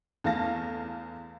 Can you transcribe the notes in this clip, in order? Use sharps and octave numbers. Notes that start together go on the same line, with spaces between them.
E2 A3 F5 A5 A#6